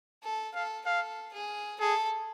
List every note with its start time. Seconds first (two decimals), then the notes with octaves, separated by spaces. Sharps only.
0.23 A4
0.55 A4 F5
0.86 A4 F5
1.33 G#4
1.80 G#4 A4